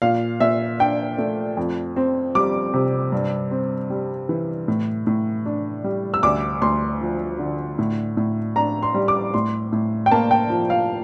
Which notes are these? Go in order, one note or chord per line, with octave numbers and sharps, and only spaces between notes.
A#2 F5
A#2 E5
D4 G5
A3
F2
C4
G3 D6
C3
G2
C4
G3
E3
A2
A2
D4
G3
E6
D2 D6
D2 C6
F3
D3
A2
A2
D4 A#5
C6
G3
D6
A2 C6
A2
G5
A#3 A5
G5
F3
F5